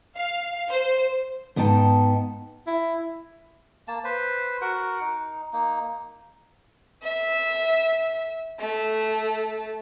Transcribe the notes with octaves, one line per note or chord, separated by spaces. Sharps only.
F5
C5
G#2 B3 D#4 G5 A5
E4
A#3 A5
B4 C5
F#4 A#4 F#5
D#4
A#3 D#4
E5
A3